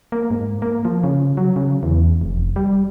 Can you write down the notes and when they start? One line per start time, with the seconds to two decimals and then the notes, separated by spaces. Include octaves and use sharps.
0.12 A#3
0.31 G#2
0.62 A#3
0.85 F3
1.04 C#3
1.37 F#3
1.56 C#3
1.83 E2
2.21 F1
2.56 G3